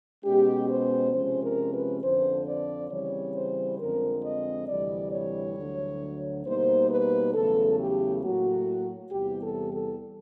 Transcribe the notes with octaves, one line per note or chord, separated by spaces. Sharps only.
B2 G#3 C#4 G4
C5
C3 F3 G#3 C#4 C5
A#4
B4
F2 D3 F3 C5
D5
C#3 E3 G3 C4 C#5
C5
F2 D3 F3 G#3 C4 A#4
D#5
D2 C3 E3 G3 D5
C#5
D2 D3 F#3
B2 G3 A#3 D#4 C5
B4
E2 C#3 F#3 A3 A4
G4
A2 F#3 A#3 F#4
E2 C3 E3 G3 G4
A4
A4